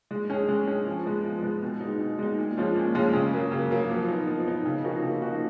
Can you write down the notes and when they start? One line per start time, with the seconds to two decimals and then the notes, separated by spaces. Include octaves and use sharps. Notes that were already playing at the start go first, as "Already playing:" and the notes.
0.11 G#3
0.30 C#4 G#4
0.49 G#3
0.67 C#4 G#4
0.86 F3
1.05 G#3 B3
1.24 F3
1.43 G#3 B3
1.63 B2
1.80 G#3 D#4
2.01 B2
2.19 G#3 D#4
2.37 A#2
2.57 F3 G#3 C#4 F4
2.75 A#2
2.94 F3 G#3 C#4 F4
3.13 C#3
3.33 F#3 A#3
3.52 C#3
3.70 F#3 A#3
3.90 F3
4.08 B3 D#4
4.27 F3
4.47 B3 D#4
4.65 C#3
4.84 F3 A#3 D#4 F#4
5.03 C#3
5.22 F3 A#3 D#4 F#4